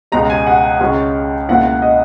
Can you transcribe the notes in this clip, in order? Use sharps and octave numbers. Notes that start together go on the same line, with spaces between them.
C#2 B2 G#3 A#5
G#5
F#5
C#2 C#3 G#3 C#4
C#2 B2 A#3 E4 F#5
D#5